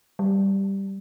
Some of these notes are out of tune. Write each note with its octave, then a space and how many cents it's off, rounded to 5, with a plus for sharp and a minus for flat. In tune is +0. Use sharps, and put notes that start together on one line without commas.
G3 +0